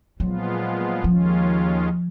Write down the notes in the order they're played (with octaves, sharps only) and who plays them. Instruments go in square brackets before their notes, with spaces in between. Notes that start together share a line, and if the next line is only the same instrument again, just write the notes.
[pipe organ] A#2 F3 G#3 B3 F4 [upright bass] F#3
[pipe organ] D#2 D#3 G#3 C#4 F4 [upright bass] F3